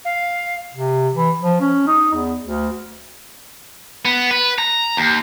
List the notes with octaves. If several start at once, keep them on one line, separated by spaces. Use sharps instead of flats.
F5
C3
E3
F3
C#4
D#4
E2
D2
B3
B4
A#5
D#2